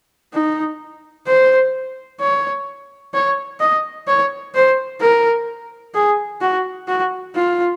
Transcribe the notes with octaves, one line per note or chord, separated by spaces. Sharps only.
D#4
C5
C#5
C#5
D#5
C#5
C5
A#4
G#4
F#4
F#4
F4